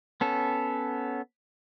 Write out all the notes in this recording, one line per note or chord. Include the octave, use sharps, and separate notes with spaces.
B3 C#4 A4